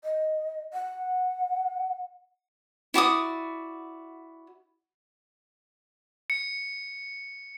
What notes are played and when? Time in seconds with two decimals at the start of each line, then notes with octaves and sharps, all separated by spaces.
0.04 D#5
0.73 F#5
2.94 E4 F#4 D5 D#6
6.30 C#7